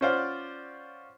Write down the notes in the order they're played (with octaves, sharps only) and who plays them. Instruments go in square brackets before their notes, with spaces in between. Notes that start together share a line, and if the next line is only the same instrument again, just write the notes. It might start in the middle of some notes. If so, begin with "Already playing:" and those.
[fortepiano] C#4 F4 C5 D5 F5 F#5